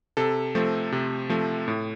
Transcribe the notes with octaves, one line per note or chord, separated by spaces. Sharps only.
C3 A4
F3 A3 C4
C3
F3 A3 C4
A2